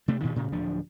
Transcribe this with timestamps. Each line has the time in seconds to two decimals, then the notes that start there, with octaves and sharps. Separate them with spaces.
0.08 C3 A3 C4
0.22 D2 G2 A#2 D#3
0.36 A2 C#3
0.52 D1 F3 D4